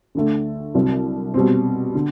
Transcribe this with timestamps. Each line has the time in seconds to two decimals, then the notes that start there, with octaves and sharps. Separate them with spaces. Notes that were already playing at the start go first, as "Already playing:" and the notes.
0.15 D2 D3 A3
0.74 C2 C3 F#3 C4
1.34 B2 G3 C4
1.95 D3